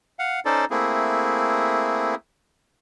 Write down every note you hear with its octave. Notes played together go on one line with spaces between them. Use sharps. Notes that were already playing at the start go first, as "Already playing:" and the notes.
F5 F#5
C#4 D#4 A4 C5 D5
A3 A#3 C4 E4 G#4